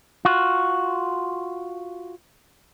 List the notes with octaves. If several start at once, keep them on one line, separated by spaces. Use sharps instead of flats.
F4 F#4